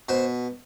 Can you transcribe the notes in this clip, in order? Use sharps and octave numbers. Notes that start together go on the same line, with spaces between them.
B2 C5